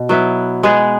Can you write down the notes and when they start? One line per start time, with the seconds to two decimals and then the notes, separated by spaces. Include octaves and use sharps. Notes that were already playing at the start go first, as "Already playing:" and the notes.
Already playing: B2
0.09 F#3 B3 E4
0.63 G#3 B3 G#4